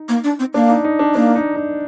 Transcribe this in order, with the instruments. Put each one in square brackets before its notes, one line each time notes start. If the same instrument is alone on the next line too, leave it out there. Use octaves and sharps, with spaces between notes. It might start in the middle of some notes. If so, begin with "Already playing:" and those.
Already playing: [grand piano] D#4
[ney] A#3
D4
C4
[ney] A#3 [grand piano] D4
[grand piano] D#4
D#4
D4
[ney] A#3 [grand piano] D4
[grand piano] D#4
D#4